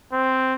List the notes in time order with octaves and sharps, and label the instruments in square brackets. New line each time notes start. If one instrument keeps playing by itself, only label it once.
[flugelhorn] C4